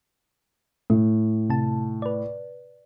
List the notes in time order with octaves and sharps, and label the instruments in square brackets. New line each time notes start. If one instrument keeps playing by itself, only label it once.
[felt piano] A2 [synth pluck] A3
[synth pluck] C3 A5
B4 D5